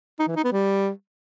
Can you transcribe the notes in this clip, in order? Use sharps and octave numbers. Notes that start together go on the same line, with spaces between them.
D#4
E3
D#4
B3
G3